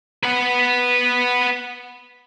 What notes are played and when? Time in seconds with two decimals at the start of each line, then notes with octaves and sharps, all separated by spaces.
0.23 B4 F#5